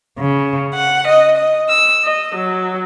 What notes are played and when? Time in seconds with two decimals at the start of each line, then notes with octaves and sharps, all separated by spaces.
0.18 C#3
0.74 F#5
1.07 D#5
1.37 D#5
1.69 E6
2.05 D#5
2.35 F#3